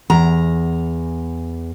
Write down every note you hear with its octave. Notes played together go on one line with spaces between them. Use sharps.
E2 A#5